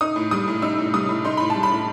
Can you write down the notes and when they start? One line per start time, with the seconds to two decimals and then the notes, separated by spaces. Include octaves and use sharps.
0.01 D#4 D#6
0.16 A2
0.31 G3 D#6
0.48 A2
0.62 D#4 E6
0.78 A2
0.94 G3 D#6
1.09 A2
1.25 D#4 C6
1.37 A2 B5
1.50 A5
1.56 G3
1.63 B5
1.71 A2